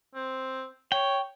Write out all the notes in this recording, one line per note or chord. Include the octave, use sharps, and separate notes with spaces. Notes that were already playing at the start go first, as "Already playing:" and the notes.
C4
C#5 G5